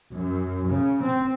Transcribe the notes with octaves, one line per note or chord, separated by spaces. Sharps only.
F#2
C#3
C4